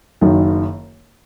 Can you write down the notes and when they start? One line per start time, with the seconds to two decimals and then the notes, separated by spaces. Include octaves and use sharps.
0.21 F#1 F#2 D#3